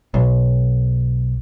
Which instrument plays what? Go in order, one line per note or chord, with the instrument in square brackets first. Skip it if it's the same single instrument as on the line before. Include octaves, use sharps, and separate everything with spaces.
[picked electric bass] B1